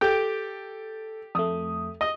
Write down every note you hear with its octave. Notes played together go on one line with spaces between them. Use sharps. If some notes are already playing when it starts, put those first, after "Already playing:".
G4 A4 G5
F2 A3 D#6
D#5 D#6